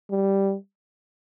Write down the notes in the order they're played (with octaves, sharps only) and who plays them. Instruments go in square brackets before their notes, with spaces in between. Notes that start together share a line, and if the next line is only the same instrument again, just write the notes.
[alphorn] G3